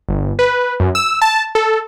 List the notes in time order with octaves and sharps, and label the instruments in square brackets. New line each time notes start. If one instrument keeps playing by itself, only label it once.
[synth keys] G1
B4
F#2
E6
A5
A4